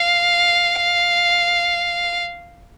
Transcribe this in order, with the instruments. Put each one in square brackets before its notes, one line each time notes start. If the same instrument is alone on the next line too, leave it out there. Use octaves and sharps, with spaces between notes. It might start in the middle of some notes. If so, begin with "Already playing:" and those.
Already playing: [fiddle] F5